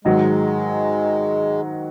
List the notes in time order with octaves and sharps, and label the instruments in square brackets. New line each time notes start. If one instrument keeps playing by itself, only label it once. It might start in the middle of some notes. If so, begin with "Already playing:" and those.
[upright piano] G#2 D#3 F#3 [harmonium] G#3